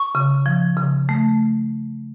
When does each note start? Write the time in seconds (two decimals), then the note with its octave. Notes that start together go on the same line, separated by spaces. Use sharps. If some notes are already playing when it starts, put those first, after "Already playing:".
Already playing: C#6
0.15 C#3
0.46 F3
0.77 C#3
1.09 A3